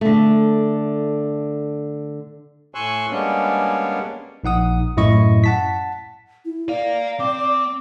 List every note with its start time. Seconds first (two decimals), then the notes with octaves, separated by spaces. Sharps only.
0.01 D3 A3
2.75 A2 G#5 C6 C#6 E6 F#6
3.10 G3 G#3 A#3 B3 C#4 D4
4.44 A#1 D#4 F#5 D#6
4.97 F#2 A2 E4 D#5 C#6
5.44 F#5 A5 B6
6.45 E4
6.69 D5 F5 A#5
7.19 C4 D6